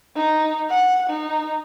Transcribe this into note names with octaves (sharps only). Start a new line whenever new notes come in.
D#4
F#5
D#4